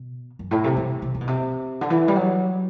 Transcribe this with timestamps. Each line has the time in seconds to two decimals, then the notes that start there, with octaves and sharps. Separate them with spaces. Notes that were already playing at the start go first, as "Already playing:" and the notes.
Already playing: B2
0.39 F#2
0.51 A2
0.64 C3
0.77 E3
1.02 C3
1.14 C3
1.21 B2
1.27 C3
1.81 D3
1.90 E3
2.08 G3
2.16 F#3